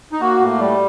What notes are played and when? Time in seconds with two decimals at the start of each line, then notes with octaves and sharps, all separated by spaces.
0.12 D#4
0.21 A#3 F#4
0.41 A2
0.60 G3